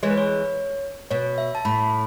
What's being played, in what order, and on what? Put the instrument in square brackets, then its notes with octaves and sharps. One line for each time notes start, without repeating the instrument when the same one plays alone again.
[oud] E3 G#3 [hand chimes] C#5
[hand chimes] B4
C#5
[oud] B2 [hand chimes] C#5
[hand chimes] E5
A5
[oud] A2 [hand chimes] B5